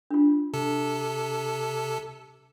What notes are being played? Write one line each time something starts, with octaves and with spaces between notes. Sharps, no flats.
D4 F4
C3 A4 A5